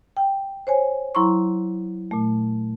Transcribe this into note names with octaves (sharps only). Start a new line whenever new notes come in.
G5
C5 C#5 G#5
F#3 E4 A#5 C6 C#6
A#2 A3